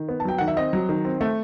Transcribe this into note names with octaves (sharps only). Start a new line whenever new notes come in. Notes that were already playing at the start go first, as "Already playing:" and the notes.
Already playing: D#3
B3
A5
F#3 G5
D#3 F#5
E5
C4 D#5
F#3
D#3
C4
A3